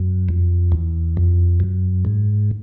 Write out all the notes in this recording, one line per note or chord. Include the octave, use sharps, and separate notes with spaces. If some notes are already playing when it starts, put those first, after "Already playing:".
Already playing: F#2
F2
E2
F2
F#2
G#2